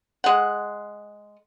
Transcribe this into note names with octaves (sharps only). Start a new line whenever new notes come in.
G#3 F#5